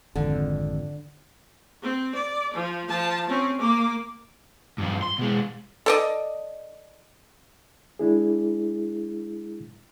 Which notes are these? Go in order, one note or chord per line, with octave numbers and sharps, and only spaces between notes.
G#1 F2 D3
C4
D5
F3
F3 A5
C4 C#4
A#3 D6
G2 F3
C6
B2 G#3
A4 D5 D#5
G#3 D4 E4 G#4